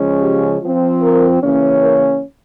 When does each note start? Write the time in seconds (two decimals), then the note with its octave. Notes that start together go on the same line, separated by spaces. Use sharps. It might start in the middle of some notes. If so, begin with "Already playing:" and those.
Already playing: C#3 F3 G#3 C#4
0.21 G4
0.61 F3 C4
1.01 A#4
1.42 C#3 E3 A#3 C#4
1.81 A#4